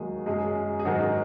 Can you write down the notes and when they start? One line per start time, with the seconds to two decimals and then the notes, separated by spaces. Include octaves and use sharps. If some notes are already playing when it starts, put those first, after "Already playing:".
Already playing: D#2 D#3 F#3 G#3 G#4
0.26 F#2 F#3 G#3 G#4
0.80 G#4
0.85 G#2 D#3 F#3 G#3 F#4